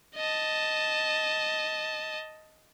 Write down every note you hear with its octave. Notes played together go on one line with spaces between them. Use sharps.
D#5 A5